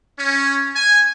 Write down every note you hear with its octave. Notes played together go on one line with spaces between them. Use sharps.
C#4
G#5